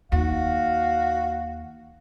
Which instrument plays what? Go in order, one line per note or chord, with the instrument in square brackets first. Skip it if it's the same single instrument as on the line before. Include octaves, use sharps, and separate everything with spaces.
[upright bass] D#2 [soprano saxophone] F#4 [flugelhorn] F5